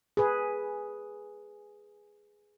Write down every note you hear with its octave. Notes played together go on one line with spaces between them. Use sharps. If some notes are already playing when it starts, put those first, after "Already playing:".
G#4 B4